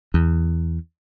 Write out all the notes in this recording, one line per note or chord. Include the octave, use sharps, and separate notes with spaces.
E2